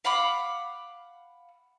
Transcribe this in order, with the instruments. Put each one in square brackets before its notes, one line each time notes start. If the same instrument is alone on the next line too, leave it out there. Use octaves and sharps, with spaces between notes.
[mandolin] F5 F#5 B5 D6